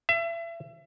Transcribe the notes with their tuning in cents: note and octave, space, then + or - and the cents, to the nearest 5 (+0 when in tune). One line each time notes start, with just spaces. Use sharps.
E5 +35